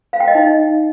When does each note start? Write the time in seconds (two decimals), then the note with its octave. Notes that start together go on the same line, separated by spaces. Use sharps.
0.13 F5
0.20 G5
0.28 D#5
0.35 D#4